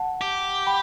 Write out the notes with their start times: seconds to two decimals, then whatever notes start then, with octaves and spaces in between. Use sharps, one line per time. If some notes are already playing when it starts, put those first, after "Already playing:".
Already playing: F#5 A5
0.21 G4
0.67 G5 B5